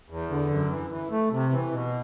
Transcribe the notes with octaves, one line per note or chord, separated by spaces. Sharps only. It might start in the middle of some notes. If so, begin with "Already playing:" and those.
E2
D3
F#2
E3
E3
A3
C3
E3
B2